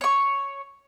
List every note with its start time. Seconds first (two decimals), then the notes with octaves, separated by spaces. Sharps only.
0.01 C#5 C#6